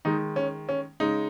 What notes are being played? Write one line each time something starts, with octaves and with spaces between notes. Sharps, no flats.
D#3 G#3 D#4
C#4
C#4
C#3 G#3 D#4